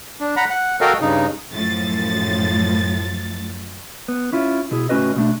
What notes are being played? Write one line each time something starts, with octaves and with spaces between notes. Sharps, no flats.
D4
F#5 A#5 B5
F#5
F#4 A4 A#4 D#5 F5 G5
G2 C#3 D#4
F#2 A2 F3 A6
B3
C#4 E4 F4
B2 E4 G#4
C#2 A2 C#4 F#4 B4 D#5
B2 A3 D4